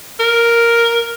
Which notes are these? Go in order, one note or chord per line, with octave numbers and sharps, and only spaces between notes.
A#4